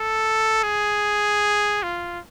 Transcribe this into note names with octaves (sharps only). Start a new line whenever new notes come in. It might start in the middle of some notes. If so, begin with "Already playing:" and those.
Already playing: A4
G#4
F4